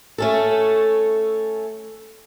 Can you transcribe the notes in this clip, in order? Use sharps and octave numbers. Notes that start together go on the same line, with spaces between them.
A3 C#4 A4